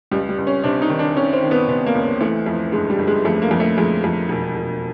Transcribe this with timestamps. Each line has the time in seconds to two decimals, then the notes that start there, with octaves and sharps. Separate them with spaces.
0.11 C#2 G3
0.29 G3
0.38 C#2
0.47 C#4
0.64 C3 D4
0.82 D#4
0.90 D#3
0.99 D4
1.16 D#3 C#4
1.33 C4
1.43 D#3
1.51 B3
1.68 C3 B3
1.86 A#3
1.95 C#2
2.21 E3 A3
2.46 F2
2.72 G1 G#3
2.90 G3
2.99 G1
3.07 G#3
3.25 F2 A3
3.42 A#3
3.51 F2
3.60 A3
3.78 F2 G#3
4.04 F2
4.29 E1
4.56 E1